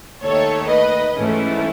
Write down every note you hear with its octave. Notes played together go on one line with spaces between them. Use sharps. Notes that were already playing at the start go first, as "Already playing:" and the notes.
D#2 D#3 A3 A4 C#5
B4 D#5
G#2 E3 A3 C#4